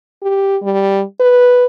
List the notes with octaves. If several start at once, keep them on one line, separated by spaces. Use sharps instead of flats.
G4
G3
B4